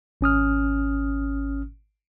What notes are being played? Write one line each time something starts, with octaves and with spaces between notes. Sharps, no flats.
G#1 C#4 D#6 F6